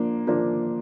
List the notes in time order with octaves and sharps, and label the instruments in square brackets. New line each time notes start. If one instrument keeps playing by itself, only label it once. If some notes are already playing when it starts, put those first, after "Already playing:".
Already playing: [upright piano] F3 A#3 D4
F3 A#3 D4